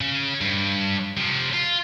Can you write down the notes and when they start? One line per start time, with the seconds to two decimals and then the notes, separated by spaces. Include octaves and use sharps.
0.01 C#3
0.41 G2
1.17 C3 F3
1.54 F4